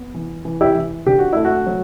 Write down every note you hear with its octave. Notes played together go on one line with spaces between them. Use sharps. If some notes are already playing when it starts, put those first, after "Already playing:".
Already playing: B3
E3
E3
E4 G4
E3
D3 G4
F#4
A3 E4
F#4
F#3